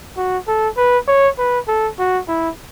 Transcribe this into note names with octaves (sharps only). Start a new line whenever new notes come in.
F#4
A4
B4
C#5
B4
A4
F#4
E4